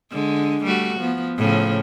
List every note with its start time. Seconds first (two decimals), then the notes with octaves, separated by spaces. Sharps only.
0.12 D3 G#3
0.64 G3 A3 F#4
0.99 F3 B3
1.38 A2 C#3 F3